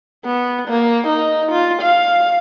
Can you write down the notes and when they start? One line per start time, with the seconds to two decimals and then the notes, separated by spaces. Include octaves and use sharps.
0.25 B3
0.68 A#3
1.07 D#4
1.51 F4
1.82 F5